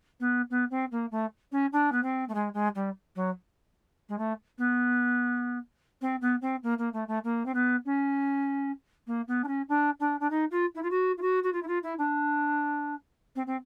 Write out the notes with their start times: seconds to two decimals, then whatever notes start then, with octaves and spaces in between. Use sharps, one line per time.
0.20 B3
0.50 B3
0.70 C4
0.91 A#3
1.11 A3
1.52 C#4
1.72 D4
1.92 B3
2.03 C4
2.28 A3
2.34 G#3
2.54 G#3
2.75 G3
3.15 F#3
4.09 G#3
4.18 A3
4.58 B3
6.01 C4
6.21 B3
6.41 C4
6.63 A#3
6.78 A#3
6.93 A3
7.08 A3
7.24 A#3
7.45 C4
7.54 B3
7.85 C#4
9.07 A#3
9.27 B3
9.44 D4
9.47 C#4
9.69 D4
10.00 D4
10.20 D4
10.30 D#4
10.51 F4
10.75 E4
10.82 F4
10.90 F#4
11.17 F4
11.21 F#4
11.43 F#4
11.52 F4
11.62 E4
11.67 F4
11.83 E4
11.98 D4
13.35 C4
13.46 C4